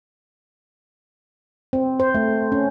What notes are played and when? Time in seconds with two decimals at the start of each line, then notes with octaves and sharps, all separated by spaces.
1.73 C4
2.00 C5
2.15 A3
2.52 C#4